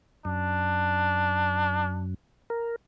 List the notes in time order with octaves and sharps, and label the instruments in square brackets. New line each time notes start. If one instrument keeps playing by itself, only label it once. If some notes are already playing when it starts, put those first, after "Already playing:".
[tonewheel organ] F#2 [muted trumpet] D4
[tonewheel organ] A#4